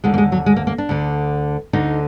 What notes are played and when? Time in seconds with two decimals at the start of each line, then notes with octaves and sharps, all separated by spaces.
0.04 D#2 D3 G#3
0.14 A#3
0.18 G#3
0.32 F#3
0.46 G#3
0.56 A#3
0.67 A#3
0.78 D4
0.89 D2 D3
1.73 D2 D3 D#4